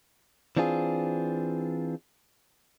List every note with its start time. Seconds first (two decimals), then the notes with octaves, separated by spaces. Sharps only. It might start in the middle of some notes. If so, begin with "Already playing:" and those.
0.57 E3 C4 D4 F4 G#4